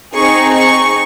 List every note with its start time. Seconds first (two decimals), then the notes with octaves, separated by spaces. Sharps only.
0.16 C4 D#4 G#4 C#6
0.56 C#6